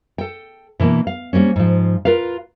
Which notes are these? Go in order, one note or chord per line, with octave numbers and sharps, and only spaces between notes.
A4 G5
B2 E3 A#3 D4
F5
G3 A#3 C4 C#4
G#2 F3
F4 A#4 B4 F5